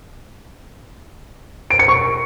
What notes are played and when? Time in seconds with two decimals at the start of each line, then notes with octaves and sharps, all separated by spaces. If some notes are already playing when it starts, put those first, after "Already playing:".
1.70 D7
1.79 C#7
1.88 C#6